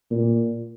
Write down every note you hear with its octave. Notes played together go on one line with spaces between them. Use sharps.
A#2